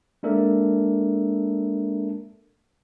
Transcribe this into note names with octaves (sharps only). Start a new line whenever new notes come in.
G#3 A#3 D4 A4 A#4 E5